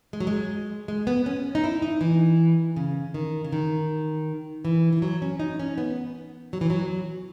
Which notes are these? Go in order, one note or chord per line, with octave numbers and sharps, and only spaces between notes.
G#3
F#3
G#3
G#3
B3
C#4
D#4
E4
D#4
E3
C#3
D#3
C#3
D#3
E3
E3
F#3
C#4
D#4
C#4
B3
F#3
E3
F#3